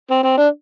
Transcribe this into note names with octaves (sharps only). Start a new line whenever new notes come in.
C4
C4
D4